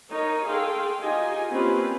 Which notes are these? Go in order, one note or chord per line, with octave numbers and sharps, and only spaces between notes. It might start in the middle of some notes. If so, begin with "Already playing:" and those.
D#4 A#4 C#5 D#5
G#4 A4 F5 G5 C6
D#4 F4 G4 D#5 G#5
A#3 C4 C#4 F4 G4 B4